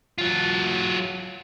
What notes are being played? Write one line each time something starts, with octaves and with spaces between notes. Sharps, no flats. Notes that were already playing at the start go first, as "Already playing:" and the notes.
F#3 F4